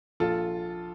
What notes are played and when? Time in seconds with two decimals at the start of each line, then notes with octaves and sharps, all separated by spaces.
0.20 A#1 F4 A4